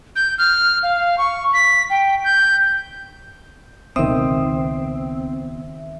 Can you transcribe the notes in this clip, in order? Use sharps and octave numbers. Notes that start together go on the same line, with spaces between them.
G6
F6
F5
C#6
B6
G5
G6
C#2 B2 D#3 C4 E5 D#6